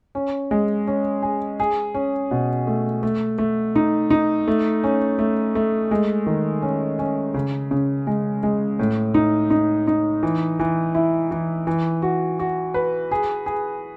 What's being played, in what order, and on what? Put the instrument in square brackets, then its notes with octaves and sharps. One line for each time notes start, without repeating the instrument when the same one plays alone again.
[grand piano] C#4
G#3
C#4
G#4
G#4
C#4
B2
A3
A3
A3
D#4
D#4
A3
C#4
A3
A3
G#3
D#3
C#4
C#4
C#3
C#3
G#3
G#3
A2
D#4
D#4
D#4
E3
E3
E4
E3
E3
F#4
F#4
B4
G#4
G#4